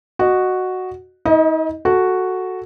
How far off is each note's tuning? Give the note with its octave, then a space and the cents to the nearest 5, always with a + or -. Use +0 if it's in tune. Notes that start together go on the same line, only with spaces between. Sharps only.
F#4 +0 D#5 -25
D#4 +45 D#5 +5
F#4 +0 A4 +0